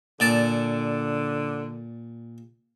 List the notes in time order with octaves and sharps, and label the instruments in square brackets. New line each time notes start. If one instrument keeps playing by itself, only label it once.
[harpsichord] A#2 D5 A5 [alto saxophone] D3